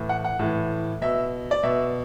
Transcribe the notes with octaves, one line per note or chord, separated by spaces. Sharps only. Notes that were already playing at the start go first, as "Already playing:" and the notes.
Already playing: A2 E3
F#5
F#5
A2 E3
B2 E5
D5
B2 E5